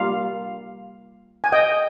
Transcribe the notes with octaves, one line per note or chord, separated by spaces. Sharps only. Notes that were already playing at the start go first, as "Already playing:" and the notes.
Already playing: G3 A#3 F4 F5
G#5
D#5 G5